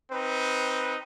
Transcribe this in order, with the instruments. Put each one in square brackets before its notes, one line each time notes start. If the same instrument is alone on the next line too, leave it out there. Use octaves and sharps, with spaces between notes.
[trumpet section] C4 D#4 B4